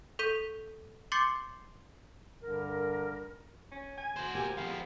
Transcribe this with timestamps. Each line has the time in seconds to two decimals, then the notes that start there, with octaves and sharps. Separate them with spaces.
0.19 A4 C#6 G6 B6 D#7
1.12 C6 D6 G6 A6 C7 C#7
2.41 G2 D3 G3 A#4
3.72 C#4
3.98 G#5
4.16 F#4 C5
4.35 C4 G4 A#4 G#5
4.57 F2 B3 F5